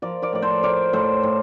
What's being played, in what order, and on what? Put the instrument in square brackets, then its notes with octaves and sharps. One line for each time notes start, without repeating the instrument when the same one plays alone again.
[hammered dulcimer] F3 A#4 D5
A#4 D5
A2 D5
A4 C5
A2 A#4 D5
A2 A4 C5
A2